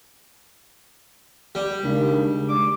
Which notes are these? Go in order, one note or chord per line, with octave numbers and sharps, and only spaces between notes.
G3
D#2 C#3 G#3 D4
D6